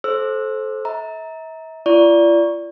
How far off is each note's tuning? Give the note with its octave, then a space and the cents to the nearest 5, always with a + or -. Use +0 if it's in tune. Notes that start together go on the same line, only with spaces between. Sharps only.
A4 -25 C5 +15 E6 +10
E5 -40 A#5 +0
F4 -45 D5 -10 C#6 +0